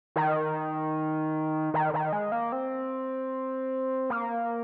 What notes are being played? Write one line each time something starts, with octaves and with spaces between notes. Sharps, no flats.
D#3
D#3
D#3
G#3
A#3
C4
A#3